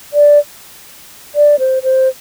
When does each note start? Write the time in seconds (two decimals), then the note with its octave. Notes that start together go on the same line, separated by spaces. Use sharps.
0.13 D5
1.35 D5
1.59 C5
1.83 C5